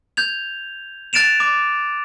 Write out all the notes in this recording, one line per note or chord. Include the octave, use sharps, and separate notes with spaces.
G6 G#6 F7
F#6 A6 D7 E7 F7
D6